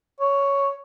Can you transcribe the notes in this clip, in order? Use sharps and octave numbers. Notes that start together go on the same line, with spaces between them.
C#5